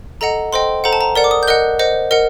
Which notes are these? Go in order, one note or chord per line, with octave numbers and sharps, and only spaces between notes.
A4 D#5 F#5 A#5
A4 C5 D#5 G5 C6
A4 C5 F#5 A#5
A5
A#5
A#4 D5 F#5
D6
D#6
G6
A#4 D#5 F#5 F#6
C5 D#5 F#5
A#4 D#5 F#5